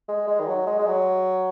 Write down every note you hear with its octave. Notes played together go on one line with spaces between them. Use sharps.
G#3
G#3
D#3
F#3
G#3
G#3
F#3